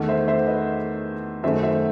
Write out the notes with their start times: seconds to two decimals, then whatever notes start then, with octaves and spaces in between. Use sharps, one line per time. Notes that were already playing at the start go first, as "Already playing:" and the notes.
Already playing: E2 D#3 A3
0.09 C5 E5
0.28 C5 E5
0.47 B4 D#5
1.43 F#2 D#3 F#3 A3 C5 E5
1.63 C5 E5